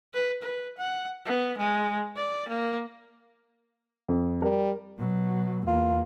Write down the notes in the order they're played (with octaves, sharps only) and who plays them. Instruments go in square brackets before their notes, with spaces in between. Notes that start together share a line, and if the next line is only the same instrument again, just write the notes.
[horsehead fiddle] B4
B4
F#5
B3
G#3
D5
A#3
[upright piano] F2
[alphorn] G3 [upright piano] A#4
[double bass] B2 F#3
[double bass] E2 A#3 [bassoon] F4